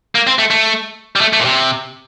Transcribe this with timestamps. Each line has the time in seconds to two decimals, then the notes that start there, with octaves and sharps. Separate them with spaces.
0.15 A#3
0.27 C4
0.39 A3
0.51 A3
1.16 G3
1.21 A3
1.33 A3
1.40 A#2
1.45 C3